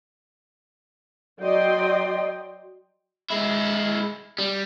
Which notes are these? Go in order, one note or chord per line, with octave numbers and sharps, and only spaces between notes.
F#3 D5 D#5 G5 C6
G#3 E4
G3